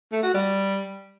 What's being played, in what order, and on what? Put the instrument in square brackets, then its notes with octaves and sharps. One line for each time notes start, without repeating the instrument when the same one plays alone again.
[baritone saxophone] A3
F#4
G3